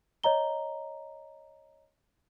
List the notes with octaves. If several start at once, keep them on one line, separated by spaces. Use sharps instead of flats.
C#5 D#5 A#5 G7